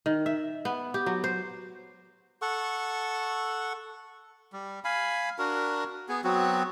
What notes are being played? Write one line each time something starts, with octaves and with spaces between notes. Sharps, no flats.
D#3
E5
B3
G4
F#3
C5
A4 F#5 C#6
G3
F5 G#5 B5
D4 F#4 A#4
B3 G#4
F#3 B3 C4 F#4